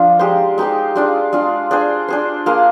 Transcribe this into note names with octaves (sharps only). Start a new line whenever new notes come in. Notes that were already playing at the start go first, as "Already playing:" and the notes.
Already playing: F3 D4 F4
G#3 D#4 G4 C5
G#3 D#4 G4 C5
G#3 D4 F4
G#3 D4 F4
D4 G#4 C5
D4 G#4 C5
A#3 F4 G#4